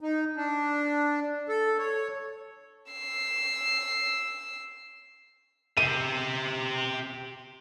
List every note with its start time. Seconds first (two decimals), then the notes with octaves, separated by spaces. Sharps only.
0.01 D#4
0.37 D4
1.49 A4
1.78 C#5
2.92 E6 C7
5.77 G4 E5 D#7